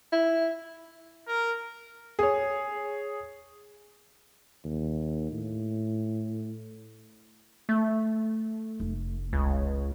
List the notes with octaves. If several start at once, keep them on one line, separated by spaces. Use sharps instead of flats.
E4
A#4
G#4 C#5
D#2
A2
A3
F1
C#2